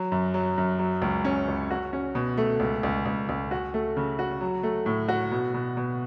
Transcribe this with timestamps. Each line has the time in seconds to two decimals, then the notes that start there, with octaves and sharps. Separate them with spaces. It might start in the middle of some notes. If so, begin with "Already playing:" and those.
Already playing: F#3
0.12 F#2
0.34 F#3
0.58 F#2
0.79 F#3
1.02 C#2
1.25 C#4
1.48 C#2
1.71 F#4
1.93 C#4
2.15 B2
2.37 A3
2.60 C#2
2.83 C#2
3.06 C#2
3.29 C#2
3.51 F#4
3.74 A3
3.97 C#3
4.19 F#4
4.41 F#3
4.63 A3
4.86 A2
5.08 F#4
5.31 B2
5.54 B2
5.77 B2